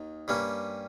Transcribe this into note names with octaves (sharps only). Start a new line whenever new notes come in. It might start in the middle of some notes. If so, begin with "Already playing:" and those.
Already playing: D#2 D#3
G2 G3 A#3 C#4